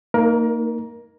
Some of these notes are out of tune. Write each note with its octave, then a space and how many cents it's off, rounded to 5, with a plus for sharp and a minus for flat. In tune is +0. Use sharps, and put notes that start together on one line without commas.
A#3 -25 D#4 +0 A#4 +20